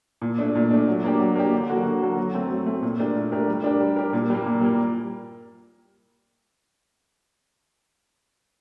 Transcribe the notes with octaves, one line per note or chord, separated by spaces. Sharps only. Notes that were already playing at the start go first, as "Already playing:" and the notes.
A#2
A3 D4
A#2
A3 D4
F#3
A#3 D4 G4
F#3
A#3 D4 G4
D3
F#3 A#3 F#4 A4
D3
F#3 A#3 F#4 A4
F#3
A3 C4
F#3
A3 C4
A#2
A3 D4 G4 A#4
A#2
A3 D4 G4 A#4
G3
D4 G4 A#4
G3
D4 G4 A#4
A#2
G3 A#3
A#2
G3 A#3